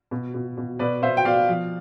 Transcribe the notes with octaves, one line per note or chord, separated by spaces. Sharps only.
B2
B2
B2
B2 B4 D5
B2 C5 E5
G5
B2 D5 F5
F3